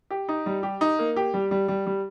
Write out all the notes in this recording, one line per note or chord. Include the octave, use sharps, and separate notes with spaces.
G4
D#4
G3
G4
D#4
A#3
G4
G3
G3
G3
G3